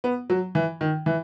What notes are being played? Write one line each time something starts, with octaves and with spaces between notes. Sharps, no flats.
B3
F#3
E3
D#3
E3